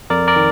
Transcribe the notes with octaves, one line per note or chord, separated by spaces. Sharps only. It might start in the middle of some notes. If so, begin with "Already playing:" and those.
F2 A#4 D5
A#4 D5
D#3